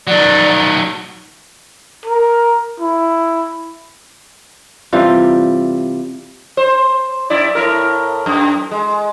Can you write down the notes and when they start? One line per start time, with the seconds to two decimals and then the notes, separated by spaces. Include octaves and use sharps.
0.07 D#3 F#3 D5
2.06 A#4
2.80 E4
4.93 C3 E3 G3 F4
6.57 C5
7.30 F#2 E4 D5
7.55 A2 E4 A#4
8.26 F#2
8.71 G#3